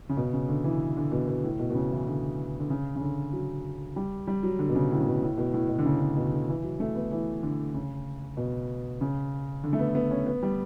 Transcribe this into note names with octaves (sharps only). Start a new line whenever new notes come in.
C#3
B2
C#3
D3
E3
D3
B2
B2
A2
B2
B2
C#3
E3
D3
D3
C#3
C#3
D3
F#3
G3
G3
F#3
D3
B2
C#3
A2
C#3
B2
A2
B2
A2
B2
D3
C#3
D3
B2
D3
E3
F#3
A3
B3
E3
D3
C#3
B2
C#3
D3
A3
B3
B3
C#4
B3
G3